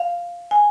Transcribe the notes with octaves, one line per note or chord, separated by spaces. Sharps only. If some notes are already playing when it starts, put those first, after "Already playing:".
Already playing: F5
G#5